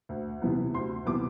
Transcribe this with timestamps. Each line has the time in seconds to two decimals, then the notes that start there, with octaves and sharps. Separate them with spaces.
0.09 D2
0.42 C3 E3 B3
0.74 D2 C6
1.06 C3 E3 B3 D6